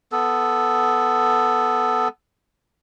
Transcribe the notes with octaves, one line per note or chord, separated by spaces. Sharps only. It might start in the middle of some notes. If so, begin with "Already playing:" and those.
B3 A4